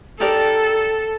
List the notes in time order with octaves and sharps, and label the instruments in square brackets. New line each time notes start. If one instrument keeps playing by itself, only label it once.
[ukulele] D#4 G4 A#4 D5 [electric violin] A4